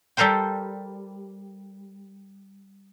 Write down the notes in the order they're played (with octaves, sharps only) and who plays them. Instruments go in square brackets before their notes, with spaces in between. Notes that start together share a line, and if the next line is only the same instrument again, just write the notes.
[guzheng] G3 A4 A#4 C5 G5